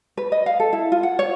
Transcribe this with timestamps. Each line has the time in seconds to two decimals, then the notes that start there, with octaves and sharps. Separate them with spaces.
0.17 B4
0.32 D#5
0.46 F5
0.60 A4
0.73 E4
0.92 F4
1.03 F#5
1.19 C#5